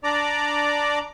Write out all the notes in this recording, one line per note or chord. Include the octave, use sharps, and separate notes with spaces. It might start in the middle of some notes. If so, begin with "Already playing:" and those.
D4 D5 A#5 D6